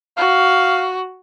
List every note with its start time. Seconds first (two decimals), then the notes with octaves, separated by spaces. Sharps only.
0.17 F#4 F5